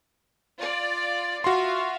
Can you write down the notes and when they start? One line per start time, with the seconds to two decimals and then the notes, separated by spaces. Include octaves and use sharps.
0.59 F4 D5
1.44 F4 F#4 E5 F5 C6